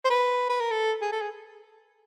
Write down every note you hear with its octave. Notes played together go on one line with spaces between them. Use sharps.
C5
B4
B4
A#4
A4
G#4
A4
G#4